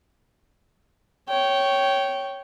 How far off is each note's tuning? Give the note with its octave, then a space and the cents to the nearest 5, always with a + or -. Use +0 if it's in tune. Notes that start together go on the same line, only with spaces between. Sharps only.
C#5 +0 G5 -15